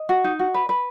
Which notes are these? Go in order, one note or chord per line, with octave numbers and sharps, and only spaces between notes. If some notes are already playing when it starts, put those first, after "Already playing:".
Already playing: D#5
F#4
D#4
F#4
B4
B4